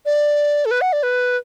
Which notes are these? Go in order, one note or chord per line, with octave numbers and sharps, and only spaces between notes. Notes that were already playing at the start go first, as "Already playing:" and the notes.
D5
A4
B4
F#5
D5
B4